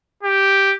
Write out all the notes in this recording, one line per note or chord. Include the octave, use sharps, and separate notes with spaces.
G4